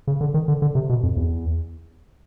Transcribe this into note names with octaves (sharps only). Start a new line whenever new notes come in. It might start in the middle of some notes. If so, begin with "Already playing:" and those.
C#3
D3
D#3
D3
D3
C3
B2
F2
E2